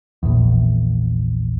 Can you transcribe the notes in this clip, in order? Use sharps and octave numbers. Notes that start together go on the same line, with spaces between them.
A#1 E2